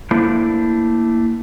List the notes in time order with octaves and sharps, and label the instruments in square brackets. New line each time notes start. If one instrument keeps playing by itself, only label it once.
[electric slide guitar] A3 A#3 D4 E4 C5